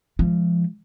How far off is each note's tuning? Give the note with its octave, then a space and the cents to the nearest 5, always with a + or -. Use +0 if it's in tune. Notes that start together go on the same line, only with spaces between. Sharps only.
F3 -20 G#3 +0